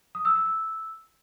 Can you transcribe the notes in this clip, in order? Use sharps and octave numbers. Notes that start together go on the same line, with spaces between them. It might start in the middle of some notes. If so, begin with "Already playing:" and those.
D#6
E6
E6
E6